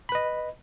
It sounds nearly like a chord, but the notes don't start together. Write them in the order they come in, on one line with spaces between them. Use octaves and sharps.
B5 B4 D#5